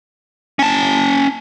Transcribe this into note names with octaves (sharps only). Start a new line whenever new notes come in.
C#4 A5